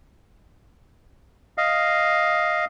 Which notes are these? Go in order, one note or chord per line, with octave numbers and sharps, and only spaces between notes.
D#5 F5